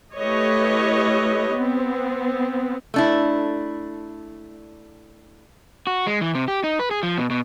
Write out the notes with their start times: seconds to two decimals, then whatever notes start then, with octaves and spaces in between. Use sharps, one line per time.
0.17 A3 E4 G4 B4 C#5 D#5
1.53 B3 C4
2.94 A3 D4 E4
5.87 F#4
6.07 G#3
6.21 E3
6.35 C3
6.48 G4
6.64 D#4
6.79 B4
6.91 G#4
7.03 F3
7.18 B2
7.30 B2